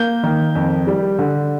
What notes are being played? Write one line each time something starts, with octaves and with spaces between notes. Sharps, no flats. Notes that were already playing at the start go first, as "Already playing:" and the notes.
Already playing: A#3 G6
D#3
F2
G3
D3